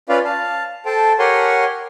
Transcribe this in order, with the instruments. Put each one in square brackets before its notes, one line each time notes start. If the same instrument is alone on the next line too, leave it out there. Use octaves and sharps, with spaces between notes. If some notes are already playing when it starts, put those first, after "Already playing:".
[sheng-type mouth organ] C#4 F4 B4 D5 F5
F5 A5
A4 C5 G5 A5
G4 A#4 C#5 F#5 G#5 C6